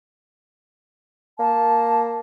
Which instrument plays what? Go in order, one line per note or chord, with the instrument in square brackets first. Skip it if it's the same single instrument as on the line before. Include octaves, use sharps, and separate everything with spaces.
[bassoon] A#3 [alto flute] A5